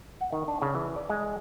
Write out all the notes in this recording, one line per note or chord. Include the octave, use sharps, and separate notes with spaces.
F#5
D#3
D4
C#3
E3
D5
G#3